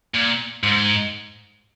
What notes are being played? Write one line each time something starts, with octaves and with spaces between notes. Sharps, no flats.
A#2
G#2